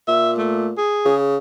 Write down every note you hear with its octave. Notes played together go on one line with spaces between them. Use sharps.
A#2 E5
A3
G#4
C#3